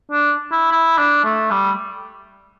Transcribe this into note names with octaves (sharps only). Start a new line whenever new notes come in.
D4
E4
E4
D4
A3
G3